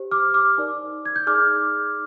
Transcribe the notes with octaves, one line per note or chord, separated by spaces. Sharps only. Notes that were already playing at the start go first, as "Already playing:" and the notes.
Already playing: G4 C5
D6 F6
D6 F6
D#4 A#4 D5
G#6
G6
D#4 G#4 D5 D6 F6